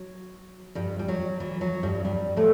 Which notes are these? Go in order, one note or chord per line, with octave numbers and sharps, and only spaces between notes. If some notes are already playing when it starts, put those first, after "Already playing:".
Already playing: F#3
G2 G3
G3
F#3
E3
F#3
G2 G3
G2 G3
A2 A3